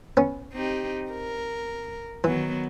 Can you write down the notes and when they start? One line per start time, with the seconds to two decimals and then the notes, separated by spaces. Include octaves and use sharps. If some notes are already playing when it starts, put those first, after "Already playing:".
0.17 B3 C#4
0.52 C4 D#4 G4
1.12 A#4
2.24 D#3 E3 F#3 B3